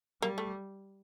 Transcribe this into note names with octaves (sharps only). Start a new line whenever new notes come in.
G3 A#3
A3